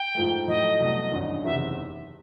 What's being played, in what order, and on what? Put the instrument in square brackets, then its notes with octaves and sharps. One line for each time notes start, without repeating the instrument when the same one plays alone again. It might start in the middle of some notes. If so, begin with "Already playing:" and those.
Already playing: [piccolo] G5
[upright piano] G#2 F3 A3
[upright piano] A2 F#3 A3 [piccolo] D#5
[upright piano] C2 B2 F#3 A3
A1 G2 D#3
[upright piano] F#1 E2 C3 D#3 [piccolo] E5